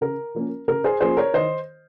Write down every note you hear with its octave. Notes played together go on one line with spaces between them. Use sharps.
C#3 A#4
F3 A#3 C#4
C#3 A#4
G#4 C5
F3 A#3 C#4 G#4 C5
A#4 C#5
D#3 C5 D#5